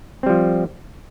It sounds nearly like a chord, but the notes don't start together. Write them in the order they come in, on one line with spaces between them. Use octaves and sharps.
C4 G3 F3